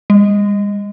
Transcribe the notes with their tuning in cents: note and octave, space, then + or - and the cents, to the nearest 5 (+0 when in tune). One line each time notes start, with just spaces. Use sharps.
G#3 -45